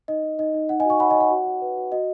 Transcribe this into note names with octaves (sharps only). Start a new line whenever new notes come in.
D#4 D#5
D#4
D#4 D#5
D#4
D#4 F#5
D#5 G#5
F#4
G#5 C#6
C#5 F#5 B5
D#5 G#5
C#5
F#5
F#4
F#4
B4
F#4
F#4 D#5